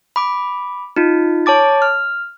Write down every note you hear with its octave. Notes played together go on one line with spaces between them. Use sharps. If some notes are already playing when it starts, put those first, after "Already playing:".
B5 D6
D#4 F4
C#5 A5 D6 A6
F6